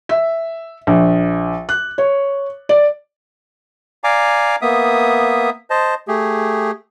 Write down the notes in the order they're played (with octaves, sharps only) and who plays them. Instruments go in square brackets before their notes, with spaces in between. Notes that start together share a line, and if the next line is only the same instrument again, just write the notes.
[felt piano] E5
A#1
F#6
C#5
D5
[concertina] D5 F5 G#5 A#5 D6
A#3 B3 E5 D#6
C5 D#5 A5
A3 G4 G#4